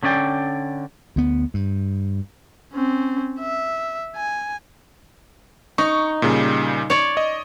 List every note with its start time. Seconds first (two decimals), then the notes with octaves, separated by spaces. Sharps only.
0.03 D3 C#4 D4 D5 G5
1.16 D2 B3
1.54 G2
2.73 C4 C#4
3.40 E5
4.16 G#5
5.78 D#4 C#6
6.22 A#2 C#3 G3
6.90 C#5 D5
7.17 D#5